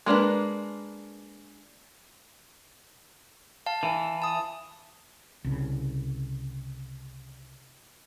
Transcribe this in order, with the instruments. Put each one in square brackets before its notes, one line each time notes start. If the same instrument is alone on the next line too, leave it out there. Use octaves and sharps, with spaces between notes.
[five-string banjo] G#3 A#3 D4 B4
[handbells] F5 A5
[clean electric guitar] E3
[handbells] A5 D#6
[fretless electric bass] C2 C#3